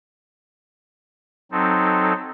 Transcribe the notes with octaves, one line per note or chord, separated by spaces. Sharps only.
F#3 C4 D#4 A4